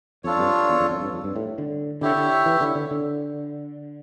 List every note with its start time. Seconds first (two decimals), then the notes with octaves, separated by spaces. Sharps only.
0.24 F2 D4 F4 A4 C#5
0.39 G2
0.69 E2
0.80 F2
0.91 F2
1.01 G2
1.13 F2
1.24 G2
1.36 A2
1.58 D3
2.01 D3 E4 G4 C#5 E5
2.17 D3
2.46 E3
2.61 D3
2.75 D3
2.91 D3